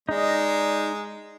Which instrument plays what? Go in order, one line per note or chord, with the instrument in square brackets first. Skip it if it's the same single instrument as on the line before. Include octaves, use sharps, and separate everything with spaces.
[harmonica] G#3 [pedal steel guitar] D#4 D#5 [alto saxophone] D5